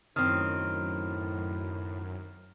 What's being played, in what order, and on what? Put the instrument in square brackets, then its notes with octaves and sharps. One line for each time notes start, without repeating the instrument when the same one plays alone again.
[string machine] F#2 [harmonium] A2 [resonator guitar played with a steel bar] D#3 C4 [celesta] F6